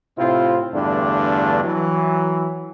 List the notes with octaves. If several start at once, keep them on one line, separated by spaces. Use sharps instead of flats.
A2 C3 C4 E4 F4
E2 G2 D3 A3 D4
E3 F#3